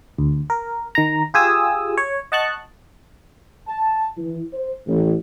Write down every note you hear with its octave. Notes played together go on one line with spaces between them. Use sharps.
D2
A#4
D#3 A#5
F4 G4 G#4 G#5 D#6 E6
C#5
D#5 F#5 A5 C#6 F#6
A5
E3
C5
A1